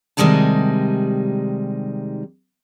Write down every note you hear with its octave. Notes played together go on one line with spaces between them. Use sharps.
C3 D#3 G3 G#3 D#4 A5